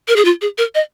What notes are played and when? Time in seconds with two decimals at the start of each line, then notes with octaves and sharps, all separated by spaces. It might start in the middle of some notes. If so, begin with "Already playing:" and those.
0.08 A#4
0.16 G#4
0.25 F4
0.42 G#4
0.58 A#4
0.75 D#5